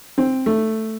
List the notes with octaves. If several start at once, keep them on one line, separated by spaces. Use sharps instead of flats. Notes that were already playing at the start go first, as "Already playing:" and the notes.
C4
A3